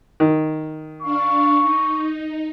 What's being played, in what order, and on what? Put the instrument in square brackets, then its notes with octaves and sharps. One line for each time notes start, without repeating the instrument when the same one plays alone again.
[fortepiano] D#3
[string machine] D4 F5 [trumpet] C#6
[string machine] D#4